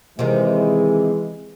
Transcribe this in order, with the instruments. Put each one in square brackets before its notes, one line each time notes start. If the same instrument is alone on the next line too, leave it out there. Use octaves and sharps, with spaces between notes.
[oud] C3 D#3 [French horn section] E3 G#3